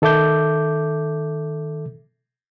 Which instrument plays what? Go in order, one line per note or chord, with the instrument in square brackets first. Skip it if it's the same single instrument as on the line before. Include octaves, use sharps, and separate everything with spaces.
[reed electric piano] D#3 A4 E5 D6 G6